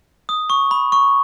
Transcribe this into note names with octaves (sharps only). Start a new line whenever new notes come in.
D#6
C#6
B5
C#6